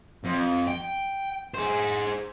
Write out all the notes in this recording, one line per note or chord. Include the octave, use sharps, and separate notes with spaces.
F2
G5
G#4 C5